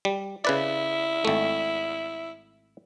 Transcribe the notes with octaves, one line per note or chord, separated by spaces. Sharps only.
G3
C#3 E4 B4 D5
G#1 A3